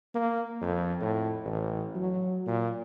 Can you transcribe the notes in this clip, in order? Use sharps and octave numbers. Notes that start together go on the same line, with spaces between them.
A#3
F2
A2
A1
F#3
A#2